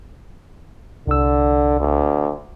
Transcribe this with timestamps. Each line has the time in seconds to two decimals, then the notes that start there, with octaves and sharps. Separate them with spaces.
1.07 C2 D3 E6
1.80 D2